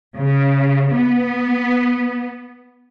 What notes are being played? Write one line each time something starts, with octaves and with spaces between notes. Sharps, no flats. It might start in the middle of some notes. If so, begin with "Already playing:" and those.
C#3
B3